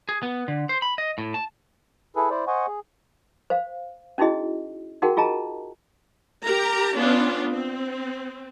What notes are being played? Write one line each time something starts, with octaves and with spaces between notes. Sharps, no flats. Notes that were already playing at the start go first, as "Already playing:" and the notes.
G#4
B3
D3
C5
B5
D#5
A2
A5
E4 G#4 A4 B4
E4 C5 D5
C5 D#5 F#5 G#5 C#6
G#4
C5 F5
C#4 D#4 E4 F#4 G#4 D#5
D#4 F#4 G#4 A#4 F#5 G5
F4 G#4 D#5 A5 A#5
G4 A#4 A#5
B3 C#4 D4 F4
C4